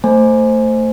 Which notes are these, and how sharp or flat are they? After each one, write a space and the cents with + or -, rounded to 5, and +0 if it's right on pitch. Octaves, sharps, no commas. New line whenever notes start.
A3 +25 C5 +5 G#5 +5